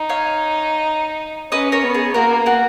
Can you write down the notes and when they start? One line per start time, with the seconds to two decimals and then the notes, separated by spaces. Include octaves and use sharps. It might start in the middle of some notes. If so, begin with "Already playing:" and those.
Already playing: D#4
0.09 C#5 F5
1.52 C#4 B4 D#5
1.72 A#4 C#5
1.83 B3
1.94 G#4
2.14 A#3 F#4 A#4
2.46 F#4 A#4